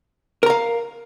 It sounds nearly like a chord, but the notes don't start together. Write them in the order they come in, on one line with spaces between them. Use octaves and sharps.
A#4 A#5 F5